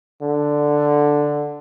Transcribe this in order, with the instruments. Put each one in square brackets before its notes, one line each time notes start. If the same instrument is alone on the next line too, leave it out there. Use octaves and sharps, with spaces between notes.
[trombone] D3